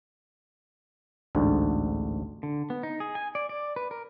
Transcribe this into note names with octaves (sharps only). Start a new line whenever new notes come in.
A1 D2 G#2 D3
D3
B3
D#4
G#4
G#5
D5
D5
B4
A#4